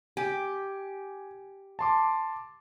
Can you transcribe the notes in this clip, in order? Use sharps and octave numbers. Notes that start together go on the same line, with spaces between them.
G4 G#5
A5 C6 D6